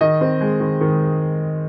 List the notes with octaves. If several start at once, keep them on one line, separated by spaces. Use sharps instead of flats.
D#3 D#5
C4
G#3
D#3
D#3